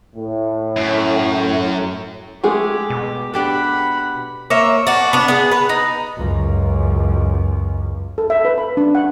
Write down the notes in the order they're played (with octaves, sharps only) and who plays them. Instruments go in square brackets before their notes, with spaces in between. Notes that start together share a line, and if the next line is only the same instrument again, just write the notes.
[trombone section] A2
[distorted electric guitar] F#2
[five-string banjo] G#3 A3 G#4 [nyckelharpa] G4
[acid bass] B2
[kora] D4 G4 A4 [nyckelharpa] F#5 B5
[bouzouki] A#3 C#5 E5
D4 F#4
B3 D4
B3 G#4
B4
D#4
[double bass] C#2 F#2
[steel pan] A4
E5
B4
B5
D4
F#5